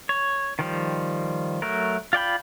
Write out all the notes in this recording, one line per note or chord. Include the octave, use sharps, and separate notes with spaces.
C#5
D#3 F3 G3
F#3 A3 A#4
F4 D5 G5 B5